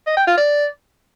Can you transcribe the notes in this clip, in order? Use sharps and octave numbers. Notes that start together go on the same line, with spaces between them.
D#5
G5
F4
D5